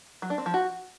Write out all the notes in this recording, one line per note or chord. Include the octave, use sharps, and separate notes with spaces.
F#3
D4
C4
F3
F#4